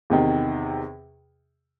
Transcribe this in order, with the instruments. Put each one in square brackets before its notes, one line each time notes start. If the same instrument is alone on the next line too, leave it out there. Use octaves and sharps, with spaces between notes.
[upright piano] E2 C3 D#3